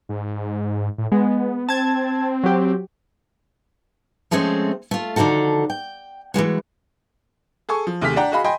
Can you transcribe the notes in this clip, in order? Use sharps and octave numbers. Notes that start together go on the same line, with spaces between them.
G#2
A2
G#3 B3
C4 A5 G#6
F#3 G4
F3 G#3 A3 C4 C#4
A3 F4
D3 D#3 F3 F#4 A4
G5
E3 F3 G#3 F#4
G#4 A4 G#5 C#6
F3
D#2 C3 A3 G#4 F6 B6
D4 D5 F#5 G5 A#5
F#4 G#4 D#5 F5 B5
D#5 G5 G#5 B5 C6